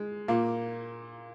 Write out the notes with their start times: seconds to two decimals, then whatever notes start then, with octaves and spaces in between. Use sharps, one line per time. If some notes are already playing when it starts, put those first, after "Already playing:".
Already playing: G#3
0.28 A#2 A#3